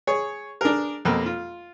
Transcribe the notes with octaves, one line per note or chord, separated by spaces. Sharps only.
G#4 C#5
D4 G#4 A#4
F2 B2 A#3
F4